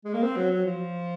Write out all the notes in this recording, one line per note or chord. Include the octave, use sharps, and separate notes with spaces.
G#3
A#3
C4
F#3
F#3
F3